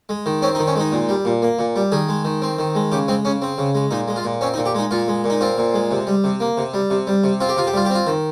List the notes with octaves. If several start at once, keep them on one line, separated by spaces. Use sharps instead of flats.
G#3
D#3
C4 C#4
D#4
D#3
C#4
G#3 D#4
A#2
G3
A#2
A#3
A#2
G3
D#3 G#4
G#3
D#3
C4
D#3
G#3
C#3 G4
G#3 C4
C#3 C#4
C4
C#3
G#3
A#2 D#4
G#3
F4
A#2
C4 C#4
D#4
A#2
G4
G#3 D#4
A#2 F4
G#3
A#2
D#4
C4 F4
A#2
G#3
C3
G3
C3
A#3
C3
G3
C3
G3
C3
C4 F4
G4
C3 F4
G4
G3 F4
G4
C4 F4
D#3